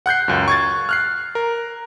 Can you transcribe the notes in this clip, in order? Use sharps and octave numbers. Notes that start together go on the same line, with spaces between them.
F#5 F#6 G6 C7
C#2 F#2
C#6 G#6 A6
F6 F#6 C7
A#4